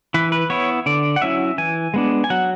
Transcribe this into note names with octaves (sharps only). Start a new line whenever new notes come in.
E3 B4
B4
B3 E4 C#5
D3 D5
F#5
F#3 C#4 E4 E5
E3 G#5
G#3 B3 D4
G#5
F#3 F#5